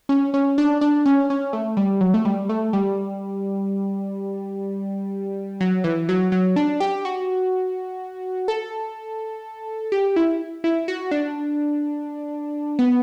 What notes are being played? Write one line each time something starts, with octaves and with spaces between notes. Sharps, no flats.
C#4
C#4
D4
D4
C#4
C#4
A3
G3
F#3
A3
G3
A3
G3
F#3
E3
F#3
F#3
D4
G4
F#4
A4
G4
E4
E4
F#4
D4
B3